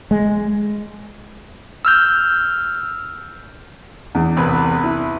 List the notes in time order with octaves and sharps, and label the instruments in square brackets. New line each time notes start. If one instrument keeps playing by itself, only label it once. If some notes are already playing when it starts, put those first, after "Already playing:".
[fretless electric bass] G#3
[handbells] E6 F6 G6
[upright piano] E2
[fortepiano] C2 B4
[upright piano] E4